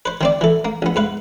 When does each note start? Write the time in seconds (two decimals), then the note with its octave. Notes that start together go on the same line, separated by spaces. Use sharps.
0.06 B4 C5
0.21 D#3 C4 D5
0.41 E3 A4
0.65 A#3
0.82 A#1 B3
0.96 G#2 B4 F5